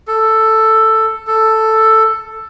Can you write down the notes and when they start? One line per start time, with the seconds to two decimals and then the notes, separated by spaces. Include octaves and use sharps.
0.08 A4
1.27 A4